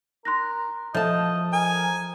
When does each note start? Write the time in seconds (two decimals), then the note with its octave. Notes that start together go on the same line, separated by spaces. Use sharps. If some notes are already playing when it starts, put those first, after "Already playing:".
0.25 A#4 C6 F#6 A#6
0.94 F3 A4 D#5 E5 A5 G6
1.53 A#4 G#5 D#6